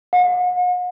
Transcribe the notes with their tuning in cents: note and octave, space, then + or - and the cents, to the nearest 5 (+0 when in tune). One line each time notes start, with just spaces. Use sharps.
F#5 -45